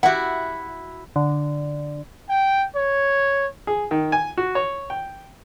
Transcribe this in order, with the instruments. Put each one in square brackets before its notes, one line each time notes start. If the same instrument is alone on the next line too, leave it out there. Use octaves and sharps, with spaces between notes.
[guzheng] E4 F#4 [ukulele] G4 E5 F#5
[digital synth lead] D3
[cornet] G5
C#5
[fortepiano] G#4
D#3
G#5
F#4
C#5
G5